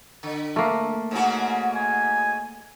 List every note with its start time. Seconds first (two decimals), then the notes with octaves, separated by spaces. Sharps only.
0.23 D3
0.56 A3 A#3
1.11 G#2 C#3 F#4
1.75 G#5